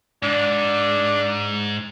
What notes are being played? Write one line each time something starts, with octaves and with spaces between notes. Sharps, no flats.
G#2 D4